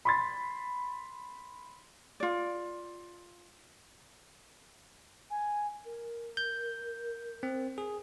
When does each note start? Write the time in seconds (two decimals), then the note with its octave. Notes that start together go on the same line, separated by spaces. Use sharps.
0.05 B5 C6 A6
2.20 F4 D5
5.30 G#5
5.85 A#4
6.37 G6
7.43 C4
7.78 G#4